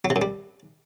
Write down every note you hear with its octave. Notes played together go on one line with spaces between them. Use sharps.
F#3
C3
F#2
G3